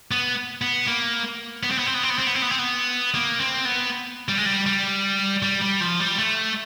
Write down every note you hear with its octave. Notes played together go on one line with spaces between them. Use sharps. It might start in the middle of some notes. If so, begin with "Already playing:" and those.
B3
B3
A#3
B3
C4
B3
C4
B3
C4
B3
C4
B3
C4
B3
C4
B3
A#3
C4
B3
G3
G#3
G3
G3
G3
G3
F3
G3
A3